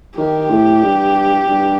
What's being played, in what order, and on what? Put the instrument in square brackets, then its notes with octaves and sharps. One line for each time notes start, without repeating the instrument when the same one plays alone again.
[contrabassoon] D#3 [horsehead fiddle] G4
[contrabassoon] A2
G2
G2